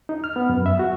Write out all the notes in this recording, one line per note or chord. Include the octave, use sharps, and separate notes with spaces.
D#4
F6
B3
F#2
E5
F#4